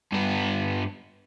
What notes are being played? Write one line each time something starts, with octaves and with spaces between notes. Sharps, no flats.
G2 B3